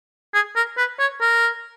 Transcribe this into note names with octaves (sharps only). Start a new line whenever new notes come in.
G#4
A#4
B4
C#5
A#4